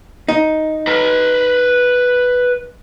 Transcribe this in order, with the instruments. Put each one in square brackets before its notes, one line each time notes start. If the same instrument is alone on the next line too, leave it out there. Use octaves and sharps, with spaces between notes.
[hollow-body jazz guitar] D#4
[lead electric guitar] B4 A#5